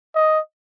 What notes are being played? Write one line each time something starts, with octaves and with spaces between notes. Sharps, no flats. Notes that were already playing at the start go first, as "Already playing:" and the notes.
D#5